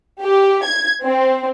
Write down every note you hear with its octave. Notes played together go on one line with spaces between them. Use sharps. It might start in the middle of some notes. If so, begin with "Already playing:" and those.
G4
G#6
C4